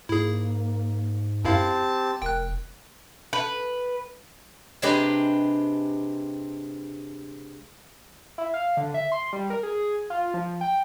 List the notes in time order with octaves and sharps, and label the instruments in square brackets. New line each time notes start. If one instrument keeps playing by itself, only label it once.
[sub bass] G#2 [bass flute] A#3 [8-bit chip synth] E4 G#4
[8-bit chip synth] F#2 E4 F5 [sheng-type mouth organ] C4 A5 [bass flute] G4
[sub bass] F1 [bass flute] A#4 [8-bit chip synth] G5 F#6
[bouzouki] B4
[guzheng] C3 G#3 D4 G4 B4 A#5
[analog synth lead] E4
F5
D3
E5
C6
G3
A#4
G#4
F4
F3
G5